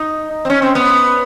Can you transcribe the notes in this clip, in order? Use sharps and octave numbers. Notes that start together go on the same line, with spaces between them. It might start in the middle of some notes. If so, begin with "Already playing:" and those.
Already playing: D#4
C4
C#4
C4
B3